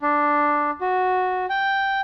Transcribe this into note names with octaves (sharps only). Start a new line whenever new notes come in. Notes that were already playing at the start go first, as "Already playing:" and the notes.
D4
F#4
G5